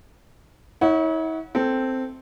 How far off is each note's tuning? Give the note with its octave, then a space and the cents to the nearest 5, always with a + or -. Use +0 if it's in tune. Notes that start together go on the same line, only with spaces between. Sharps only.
E4 -45 C#5 +0 F#5 +0
C4 -5 A4 +0